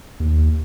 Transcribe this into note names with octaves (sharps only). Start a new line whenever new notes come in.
D#2